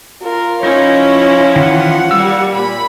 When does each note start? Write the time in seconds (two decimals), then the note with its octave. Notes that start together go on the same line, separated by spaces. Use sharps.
0.23 F4 A#4
0.63 F3 C#4 D#4 E4 C#5
1.56 D#3 E3 F#5
2.11 G3 A#3 E6
2.53 A#2 B5